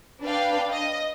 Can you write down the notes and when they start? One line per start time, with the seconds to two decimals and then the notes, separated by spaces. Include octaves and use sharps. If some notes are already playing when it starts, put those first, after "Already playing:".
0.21 D4 B4 F5 G5
0.71 D#5